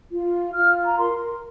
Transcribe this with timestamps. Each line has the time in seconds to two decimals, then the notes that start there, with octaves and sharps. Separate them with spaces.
0.11 F4
0.54 F4 F6
0.86 A#5
0.97 A#4 C6